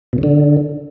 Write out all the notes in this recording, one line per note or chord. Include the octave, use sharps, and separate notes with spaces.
B2
C#3
D3